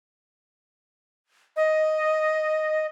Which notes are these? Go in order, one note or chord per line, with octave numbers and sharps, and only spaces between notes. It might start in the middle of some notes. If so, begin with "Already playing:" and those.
D#5